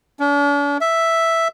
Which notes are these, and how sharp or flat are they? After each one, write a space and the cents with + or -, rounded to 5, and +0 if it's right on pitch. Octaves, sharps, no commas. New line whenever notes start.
D4 -45
E5 +0